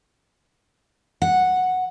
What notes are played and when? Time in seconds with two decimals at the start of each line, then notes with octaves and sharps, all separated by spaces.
1.22 F#5